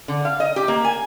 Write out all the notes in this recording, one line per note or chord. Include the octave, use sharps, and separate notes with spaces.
D3
F5
D#5
G4
A#3
G#5